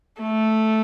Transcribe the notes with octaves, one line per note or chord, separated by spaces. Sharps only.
A3